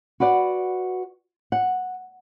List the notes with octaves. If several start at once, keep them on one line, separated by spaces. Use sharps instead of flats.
F#4 B4 D5 F#5
F#5